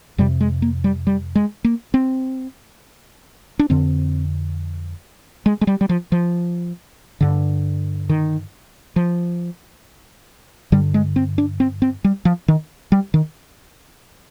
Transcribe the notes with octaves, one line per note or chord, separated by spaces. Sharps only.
F2 C3 G3
G#3
A#3
G3
G3
G#3
A#3
C4
D4
F2 D3 C4
G#3
G#3
G3
G3
F3
F3
G2 D3
D#3
F3
G2 D3 G3
G#3
C4
D4
C4
C4
G3
F3
D#3
G3
D#3